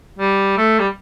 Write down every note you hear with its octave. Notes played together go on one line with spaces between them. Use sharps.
G3
A3
G3